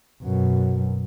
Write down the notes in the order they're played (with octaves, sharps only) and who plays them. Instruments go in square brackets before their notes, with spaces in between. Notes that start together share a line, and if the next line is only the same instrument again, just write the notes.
[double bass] F#2 B2